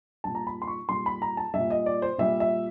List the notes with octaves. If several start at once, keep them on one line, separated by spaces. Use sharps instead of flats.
A#2 G3 A5
A#5
B5
C6
C#6
A#2 G3 C6
B5
A#5
A5
A#2 G3 E5
D#5
D5
C5
A#2 G3 E5
E5